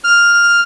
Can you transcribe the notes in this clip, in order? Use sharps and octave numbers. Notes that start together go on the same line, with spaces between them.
F6